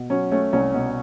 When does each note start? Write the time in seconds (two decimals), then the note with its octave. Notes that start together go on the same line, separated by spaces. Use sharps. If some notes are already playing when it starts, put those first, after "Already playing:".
Already playing: B2
0.10 F#3 C#4
0.31 A3 C#4
0.53 C2 C#4
0.74 B2